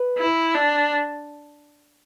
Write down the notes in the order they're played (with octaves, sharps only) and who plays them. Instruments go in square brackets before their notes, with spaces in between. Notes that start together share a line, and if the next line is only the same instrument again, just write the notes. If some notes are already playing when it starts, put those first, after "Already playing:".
Already playing: [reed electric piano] B4
[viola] E4
D4